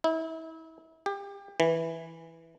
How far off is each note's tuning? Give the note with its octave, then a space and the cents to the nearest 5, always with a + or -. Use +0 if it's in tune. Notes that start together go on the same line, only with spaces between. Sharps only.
E4 -35
G4 +30
E3 -5